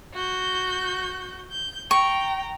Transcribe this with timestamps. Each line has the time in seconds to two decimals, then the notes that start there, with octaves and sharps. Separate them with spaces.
0.13 F#4 G6
1.52 G6
1.91 G5 A#5 C#6